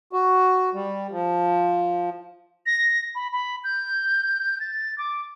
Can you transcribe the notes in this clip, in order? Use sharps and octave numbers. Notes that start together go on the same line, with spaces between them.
F#4
G3
F3
A#6
B5
B5
G6
A6
D6